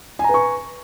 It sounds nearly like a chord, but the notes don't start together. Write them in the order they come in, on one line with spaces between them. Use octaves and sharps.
G#5 A#5 B4 C#6